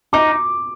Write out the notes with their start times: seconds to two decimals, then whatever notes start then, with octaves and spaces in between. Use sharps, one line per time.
0.13 D#4 D6